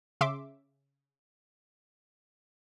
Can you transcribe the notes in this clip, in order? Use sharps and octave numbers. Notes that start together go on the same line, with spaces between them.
C#3 E5 C6 D6